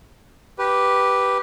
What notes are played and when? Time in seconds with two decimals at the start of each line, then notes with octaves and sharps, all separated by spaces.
0.59 G4 B4